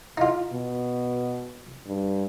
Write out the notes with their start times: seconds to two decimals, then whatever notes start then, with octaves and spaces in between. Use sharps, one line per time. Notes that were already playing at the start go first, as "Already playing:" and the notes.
0.17 D#4 F4
0.53 B2
1.86 G2